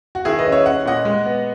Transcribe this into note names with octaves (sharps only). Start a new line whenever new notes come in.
F#4
D#3 E4 G#4
B4 D#5
C#4
C#5 E5
C#4 F#5
A#2 D#5 F#5
G#3
B3